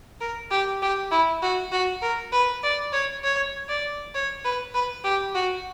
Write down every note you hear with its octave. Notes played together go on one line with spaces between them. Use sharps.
A#4
G4
G4
E4
F#4
F#4
A#4
B4
D5
C#5
C#5
D5
C#5
B4
B4
G4
F#4